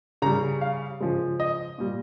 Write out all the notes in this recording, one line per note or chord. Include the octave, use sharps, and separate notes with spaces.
C#3 G3 A#5
F5
C#3 F3 G#3
D#5
A#2 G3